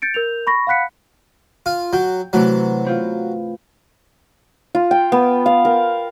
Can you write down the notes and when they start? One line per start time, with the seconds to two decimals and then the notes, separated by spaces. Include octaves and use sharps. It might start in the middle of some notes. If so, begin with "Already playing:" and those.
0.02 G6 A6 C#7 D7
0.14 A#4 G6 F7
0.47 B5 C#6 A#6
0.67 F5 F#5 B5 F#6 B6 C#7
1.66 F4
1.93 F#3 G5
2.33 C3 E3 F#3 A3
2.84 B3 C4 F4
4.75 F4
4.91 G5
5.12 B3
5.46 F5
5.65 A#4